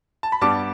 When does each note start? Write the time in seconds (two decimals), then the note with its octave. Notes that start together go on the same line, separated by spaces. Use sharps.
0.23 A5
0.32 B5
0.41 G2 G3 B3 A5 D6